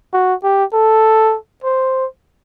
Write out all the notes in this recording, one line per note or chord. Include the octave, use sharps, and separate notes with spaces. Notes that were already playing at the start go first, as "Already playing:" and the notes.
F#4
G4
A4
C5